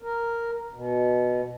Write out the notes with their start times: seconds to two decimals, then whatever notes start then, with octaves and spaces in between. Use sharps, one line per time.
0.02 A#4
0.74 B2